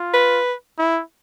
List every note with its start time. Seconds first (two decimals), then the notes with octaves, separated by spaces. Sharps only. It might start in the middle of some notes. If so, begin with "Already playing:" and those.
Already playing: F4
0.14 B4
0.78 E4